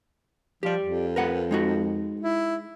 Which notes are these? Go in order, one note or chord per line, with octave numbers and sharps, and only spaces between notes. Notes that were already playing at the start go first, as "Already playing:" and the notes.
F3 G4 D5
F2
A#4 B4 F#5
G#3 D#4 F#4
E4